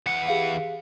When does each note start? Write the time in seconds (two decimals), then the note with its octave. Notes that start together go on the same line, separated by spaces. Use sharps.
0.06 E3 F#5
0.28 G4 G#4 F5